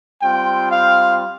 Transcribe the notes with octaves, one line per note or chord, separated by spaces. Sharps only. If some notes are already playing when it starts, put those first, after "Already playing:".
G3 C4 F4 G5
F5